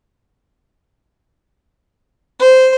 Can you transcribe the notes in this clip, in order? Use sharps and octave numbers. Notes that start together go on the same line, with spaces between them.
C5